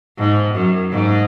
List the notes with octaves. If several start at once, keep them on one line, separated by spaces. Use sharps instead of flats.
G#2
F#2
G#2